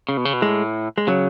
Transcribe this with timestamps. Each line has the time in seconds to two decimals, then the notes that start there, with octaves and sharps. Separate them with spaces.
0.09 C#3
0.17 B2
0.25 C#3
0.33 B2
0.42 A2 G#3
0.98 G#3
1.07 C#3 F#3